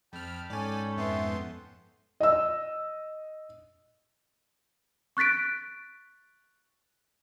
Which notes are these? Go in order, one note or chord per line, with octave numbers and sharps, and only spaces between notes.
F2 G5 A5 B5 F6
G#2 C#4 A4 D5 G#5
F2 B3 E5 G5 A5 C6
D#5 E6
C#6 F#6 A6 B6 D7